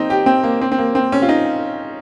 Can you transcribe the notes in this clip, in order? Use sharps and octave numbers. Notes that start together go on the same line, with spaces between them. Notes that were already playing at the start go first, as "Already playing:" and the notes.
Already playing: A#3 C4 D#4
G4
C4
A#3
C4
C4
A#3
C4
C#4
F4
D#4